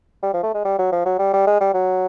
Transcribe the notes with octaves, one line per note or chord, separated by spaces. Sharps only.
G3
F3
A3
G#3
G3
F#3
F3
F#3
G3
G3
G#3
G3
F#3